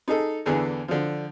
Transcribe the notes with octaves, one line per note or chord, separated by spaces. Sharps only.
D#4 G#4 A4
E2 D3 E3 G#4
D3 F3